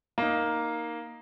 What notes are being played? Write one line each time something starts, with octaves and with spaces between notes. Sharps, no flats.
A#3 D#4